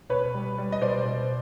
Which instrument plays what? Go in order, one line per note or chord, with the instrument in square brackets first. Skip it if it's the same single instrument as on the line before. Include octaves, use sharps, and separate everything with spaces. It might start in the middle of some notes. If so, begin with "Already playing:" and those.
[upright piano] B2 B4 C#5
G3
G3
D#5
B2 C5 D5
B2